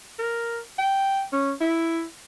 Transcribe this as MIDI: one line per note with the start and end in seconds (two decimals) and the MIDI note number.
0.19 0.59 70
0.78 1.22 79
1.33 1.52 61
1.61 2.04 64